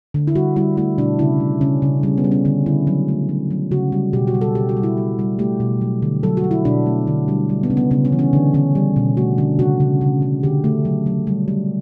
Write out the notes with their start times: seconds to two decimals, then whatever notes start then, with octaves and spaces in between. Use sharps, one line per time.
0.14 D3
0.27 E4
0.35 G3 F#4
0.56 G3 E4
0.77 A3 E4
0.98 B2 D4
1.19 C#3 E4
1.40 G3
1.61 C#3 C#4
1.82 C#3
2.03 G3 C#4
2.18 B3
2.24 G3
2.31 C#4
2.45 D3 C#4
2.66 D3 E4
2.87 F#3
3.08 A3
3.29 F#3
3.51 F#3
3.71 C#3 F#4
3.92 G3
4.13 B2 G4
4.27 F#4
4.34 G3
4.41 A4
4.55 B2 G4
4.69 F#4
4.77 G3
4.83 E4
4.97 G3
5.19 G3
5.39 A3 G4
5.60 B2
5.81 F#3
6.02 D3
6.23 F#3 A4
6.37 F#4
6.44 F#3
6.51 E4
6.65 B2 D4
6.86 A3
7.07 D3
7.28 G3
7.49 G3
7.63 B3
7.70 C#3 C#4
7.77 B3
7.91 C#3 B3
8.05 C#4
8.12 E3
8.19 C#4
8.33 D3 D4
8.54 D3 C#4
8.75 G3
8.96 B2
9.17 A3 F#4
9.38 D3 D4
9.59 C#3 F#4
9.80 C#3
10.01 C#3
10.22 C#3
10.43 D3 G4
10.64 A3
10.85 F#3
11.06 F#3
11.27 G3
11.48 G3